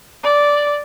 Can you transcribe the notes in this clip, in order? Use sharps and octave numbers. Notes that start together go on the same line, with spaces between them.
D5